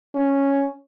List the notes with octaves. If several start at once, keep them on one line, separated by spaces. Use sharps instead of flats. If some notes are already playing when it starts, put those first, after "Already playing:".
C#4